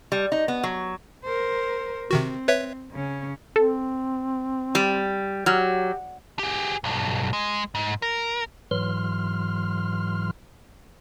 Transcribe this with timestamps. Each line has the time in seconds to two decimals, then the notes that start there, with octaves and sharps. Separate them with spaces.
0.12 G3
0.32 D#4
0.48 B3
0.63 F#3
1.24 A#4 C5
2.11 C3 D#3 C4 F#4
2.48 B4 C#5 E5
2.92 C#3 C#4
3.56 C4 A4
4.75 G3
5.46 F#3 G4 F6
6.39 G4 G#4
6.84 B1 G2
7.33 G#3
7.75 G#2
8.02 A#4
8.71 G#2 E3 F#3 C6 F6